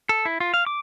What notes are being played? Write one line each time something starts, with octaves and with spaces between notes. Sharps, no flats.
A4
E4
F4
F5
D6